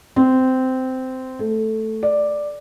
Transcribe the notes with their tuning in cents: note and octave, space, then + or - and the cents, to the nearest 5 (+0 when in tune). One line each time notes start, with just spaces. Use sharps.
C4 -15
A3 +0
D5 +5